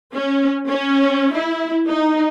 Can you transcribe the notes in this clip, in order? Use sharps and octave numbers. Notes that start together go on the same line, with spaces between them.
C#4
C#4
E4
D#4